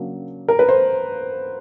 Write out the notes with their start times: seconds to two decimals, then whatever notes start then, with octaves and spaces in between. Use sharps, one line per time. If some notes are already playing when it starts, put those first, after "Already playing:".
Already playing: C#3 F#3 A#3 D4
0.48 A#4
0.59 B4
0.69 C5